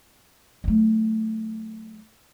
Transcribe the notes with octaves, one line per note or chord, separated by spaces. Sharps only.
F#3 A3